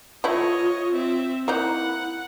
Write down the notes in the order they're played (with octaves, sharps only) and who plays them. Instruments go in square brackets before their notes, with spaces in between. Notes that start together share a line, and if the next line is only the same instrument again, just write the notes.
[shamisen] A3 E4 [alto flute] F4 [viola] C#5 D#5
[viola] C4 E5
[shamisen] A#3 D#4 [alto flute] E4 [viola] F#5